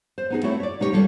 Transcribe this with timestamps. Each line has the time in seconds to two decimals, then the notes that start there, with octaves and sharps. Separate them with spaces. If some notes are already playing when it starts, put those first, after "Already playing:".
0.18 C5
0.30 B3 D#4 G#4
0.43 A3 C4 E4 F#4 C#5
0.60 C#5 D5
0.80 B2 G#3 D#4 G4 C#5
0.93 D#2 G3 F4 A4 A#4 C#5